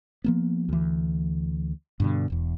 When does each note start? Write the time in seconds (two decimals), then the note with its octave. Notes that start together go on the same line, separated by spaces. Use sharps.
0.24 F3 A#3 B3
0.69 D2 E3
2.00 G2 B2 D3
2.30 E1 E2